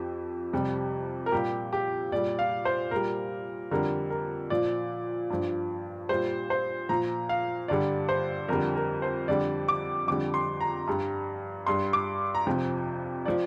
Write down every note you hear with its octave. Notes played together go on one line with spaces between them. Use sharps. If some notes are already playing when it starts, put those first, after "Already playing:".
Already playing: F2 F3 G4
F2 C3 G3
A#4
A#2 G3 G4
G4
A#2 G3 D5
F5
C5
A#2 G3 A#4
F2 D3 G3 A#4
A#4
A#2 F3 D5
G2 F3
A#2 G3 C5
C5
A#2 F3 A#5
F5
G2 D3 G3 D5
C5
F2 D3 G3 A#4
A#4
C5
F2 D3 G3 D5
D6
F2 D3 G3 D6
C6
A#5
G2 G3
G2 G3 C6
D6
A#5
F2 C3 F3 G5
F3 D5